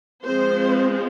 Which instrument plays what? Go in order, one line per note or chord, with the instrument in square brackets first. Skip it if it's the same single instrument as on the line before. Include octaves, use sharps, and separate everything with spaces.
[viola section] F3 G#3 C4 C5